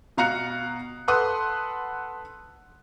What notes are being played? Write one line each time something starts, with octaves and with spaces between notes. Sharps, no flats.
B2 F5 A#5 F#6 C#7
A4 B4 F#5 C6 D#6 F#6